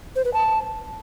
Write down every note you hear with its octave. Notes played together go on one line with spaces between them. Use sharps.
C5
B4
A5